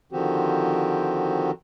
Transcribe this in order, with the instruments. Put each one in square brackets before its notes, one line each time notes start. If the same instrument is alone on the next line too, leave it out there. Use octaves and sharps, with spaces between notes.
[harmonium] D3 D#3 F3 C4 F#4 G4